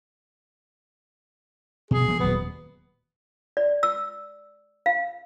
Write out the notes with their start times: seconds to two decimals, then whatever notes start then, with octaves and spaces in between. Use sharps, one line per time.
1.91 B2 G#4
2.08 F3 G3 A#3
2.20 D#1 F#3 B3
3.57 D5
3.83 E6
4.86 F5